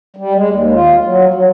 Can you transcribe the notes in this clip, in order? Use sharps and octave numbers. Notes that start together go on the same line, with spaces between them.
G3
G#3
D#2
F4
F#3
F#3